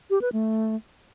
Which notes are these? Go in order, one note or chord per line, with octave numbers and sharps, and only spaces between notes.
G4
B4
A3